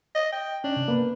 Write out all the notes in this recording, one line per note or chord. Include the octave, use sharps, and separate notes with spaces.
D#5
G5
C#4 D4
C3
A#3 B3 B4